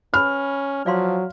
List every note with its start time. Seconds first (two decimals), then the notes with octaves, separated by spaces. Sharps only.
0.14 C#4 B4 B5 F6
0.86 F3 F#3 D5 F5 C6